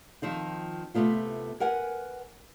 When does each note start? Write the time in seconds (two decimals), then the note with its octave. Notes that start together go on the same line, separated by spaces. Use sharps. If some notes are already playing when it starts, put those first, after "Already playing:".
0.22 D#3 F3 C4 D#4
0.94 C3 A3 B3 F4
1.60 A#4 B4 F#5 G#5